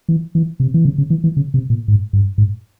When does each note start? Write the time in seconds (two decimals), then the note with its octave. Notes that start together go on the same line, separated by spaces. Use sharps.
0.09 E3
0.35 E3
0.60 C3
0.74 E3
0.85 C#3
0.98 C#3
1.10 E3
1.24 E3
1.37 C#3
1.54 C3
1.70 A#2
1.88 G#2
2.13 G2
2.38 G#2